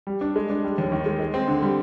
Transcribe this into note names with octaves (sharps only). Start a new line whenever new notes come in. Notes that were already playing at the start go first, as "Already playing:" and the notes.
G3
D4
G#3
D4
G3
D#2
D#3
G#3
G#3
C4
D3
G3